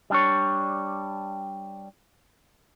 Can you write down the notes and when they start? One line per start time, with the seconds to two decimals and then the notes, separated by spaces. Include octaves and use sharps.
0.10 G3 D4 C#5